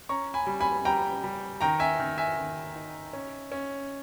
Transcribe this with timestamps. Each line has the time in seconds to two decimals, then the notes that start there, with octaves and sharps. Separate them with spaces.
0.09 C#4 A#5 C#6
0.34 G#5 B5
0.47 G3
0.61 G#5 B5
0.85 G3 G5 A#5
1.24 G3
1.61 D#3 G5 A#5
1.80 E5 G#5
1.99 D#3
2.18 E5 G#5
2.37 D#3
2.76 D#4
3.13 C#4
3.52 C#4